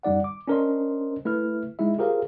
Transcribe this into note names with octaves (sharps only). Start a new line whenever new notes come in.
F#2 G3 D#4 D5 F#5
D6
C#4 D4 A#4 C5 D#5 C6
A3 E4 B4 F6
G#3 D#4 E4 E5
F4 G4 G#4 A#4 C5 F5